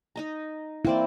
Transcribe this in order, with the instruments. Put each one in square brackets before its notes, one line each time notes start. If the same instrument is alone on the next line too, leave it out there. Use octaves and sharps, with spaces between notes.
[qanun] D#4 D#5 A#5
[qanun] A#3 C4 D5 [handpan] E4